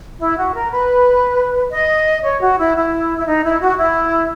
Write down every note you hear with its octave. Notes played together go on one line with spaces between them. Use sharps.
E4
F#4
A#4
B4
D#5
C#5
F#4
E4
E4
E4
D#4
E4
F#4
E4